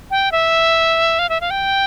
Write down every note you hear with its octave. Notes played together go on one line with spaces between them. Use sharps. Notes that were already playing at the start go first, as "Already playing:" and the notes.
G5
E5
F5
E5
F5
G5